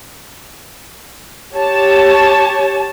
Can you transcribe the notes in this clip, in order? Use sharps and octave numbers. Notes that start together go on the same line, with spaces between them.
G4 C#5 A5